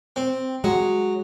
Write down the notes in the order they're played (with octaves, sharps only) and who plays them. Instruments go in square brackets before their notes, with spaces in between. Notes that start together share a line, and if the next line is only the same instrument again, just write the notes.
[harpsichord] C4
[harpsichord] F#3 [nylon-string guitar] G#3